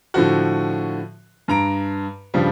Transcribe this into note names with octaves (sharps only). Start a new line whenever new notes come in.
A2 D3 F3 F#4
G2 A#5 D7
G2 C#3 F3 G3